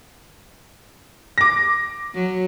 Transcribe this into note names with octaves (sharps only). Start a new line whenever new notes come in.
D6 A#6
F#3